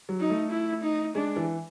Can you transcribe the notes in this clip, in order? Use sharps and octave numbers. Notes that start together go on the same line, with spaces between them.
F#3
D#4
A3
E4
D#4
G#3 D4
E3